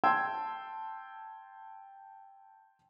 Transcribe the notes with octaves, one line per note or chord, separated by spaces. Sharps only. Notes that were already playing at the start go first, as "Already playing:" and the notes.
G5 A5 C6 E6 G#6